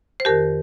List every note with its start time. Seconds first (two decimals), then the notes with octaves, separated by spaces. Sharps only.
0.20 C5
0.25 F2 D#3 G4 A#4